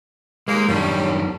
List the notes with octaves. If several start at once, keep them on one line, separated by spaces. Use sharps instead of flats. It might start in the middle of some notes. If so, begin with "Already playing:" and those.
D#2 G#3 A#3
F#2 D#3 G3 C#4 D4